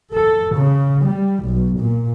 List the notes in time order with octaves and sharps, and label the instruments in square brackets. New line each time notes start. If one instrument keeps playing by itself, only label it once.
[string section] A4
C#3
G3
B1
A#2